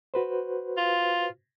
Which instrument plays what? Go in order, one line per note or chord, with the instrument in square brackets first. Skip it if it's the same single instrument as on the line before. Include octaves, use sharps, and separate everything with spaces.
[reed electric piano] F#4 B4 C5
[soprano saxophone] F4